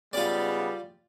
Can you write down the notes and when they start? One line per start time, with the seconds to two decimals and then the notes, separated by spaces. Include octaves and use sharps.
0.13 G#2 C#3 G3 B3 F4 D5